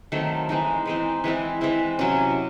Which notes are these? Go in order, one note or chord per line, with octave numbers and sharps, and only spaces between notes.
D#3 F#3 A3 C4
E3 G#3 C4 D#4
E3 G#3 C4 D#4
E3 G#3 C4 E4
E3 G#3 C4 E4
C3 F#3 C#4